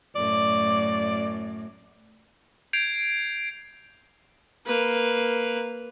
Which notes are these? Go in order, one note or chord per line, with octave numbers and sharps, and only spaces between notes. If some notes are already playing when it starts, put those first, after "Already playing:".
F#2 A2 D5
G6 G#6 C7 D7 F7
A#3 B4